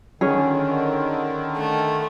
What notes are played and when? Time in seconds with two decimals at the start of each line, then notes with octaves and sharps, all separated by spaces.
0.21 D3 D#3 C#4 G#4
1.56 A3